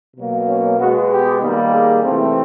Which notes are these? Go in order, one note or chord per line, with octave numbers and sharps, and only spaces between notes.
B2 F#3 A#3
C#4
B2 G#3 B3 F#4
G4
D#3 G3 A#3
G#4
C3 E3 A3 C4